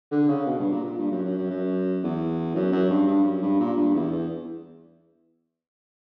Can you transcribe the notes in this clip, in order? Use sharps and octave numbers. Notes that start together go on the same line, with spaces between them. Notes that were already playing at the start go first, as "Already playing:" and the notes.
D3
C#3
B2
G2
A#2
A#2
G2
F#2
F#2
F#2
F#2
E2
F#2
F#2
G2
G2
F#2
G2
A#2
G2
E2
E2